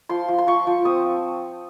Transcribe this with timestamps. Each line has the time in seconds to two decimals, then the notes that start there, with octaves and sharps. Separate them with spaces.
0.09 F3 C6
0.28 F3
0.38 C6
0.47 F3 C#6
0.67 F3
0.85 C4 D#6